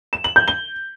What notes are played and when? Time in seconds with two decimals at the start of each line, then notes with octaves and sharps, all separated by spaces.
0.13 E7
0.24 F#7
0.36 G6
0.48 G7